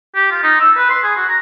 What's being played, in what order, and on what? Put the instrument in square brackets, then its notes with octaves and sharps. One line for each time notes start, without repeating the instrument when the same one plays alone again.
[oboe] G4
F4
D#4
E6
B4
C6
G#4
F#4
A#5